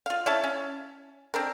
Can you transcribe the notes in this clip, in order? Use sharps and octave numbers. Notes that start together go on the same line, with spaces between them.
F4 F5
C#4 E4 A5
C#4
C4 D4 A#4